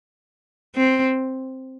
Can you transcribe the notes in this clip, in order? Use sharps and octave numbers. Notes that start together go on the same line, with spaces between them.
C4